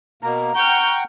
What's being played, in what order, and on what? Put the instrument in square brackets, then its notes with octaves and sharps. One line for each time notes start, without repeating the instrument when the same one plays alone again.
[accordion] B2 A#3 [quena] A#5
[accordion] F#5 G5 C#6 [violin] F6 G6